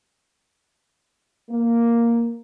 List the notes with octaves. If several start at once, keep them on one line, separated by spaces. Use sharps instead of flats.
A#3